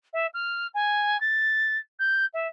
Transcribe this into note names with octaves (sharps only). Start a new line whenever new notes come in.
E5
F6
G#5
A6
G6
E5